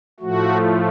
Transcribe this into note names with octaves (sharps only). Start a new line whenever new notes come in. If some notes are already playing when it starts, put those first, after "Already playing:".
A2 F3 A3 F#4